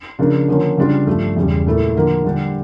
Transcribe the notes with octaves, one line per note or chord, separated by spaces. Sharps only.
C#3 F3 A#3 D4
D3 F3 A#3 C#4
C#3 G3 D4 F4
G2 F3 A3 D4
E2 C#3 G3
A#2 A3 E4 A4
D3 F3 A#3
D3 G3 D4 G4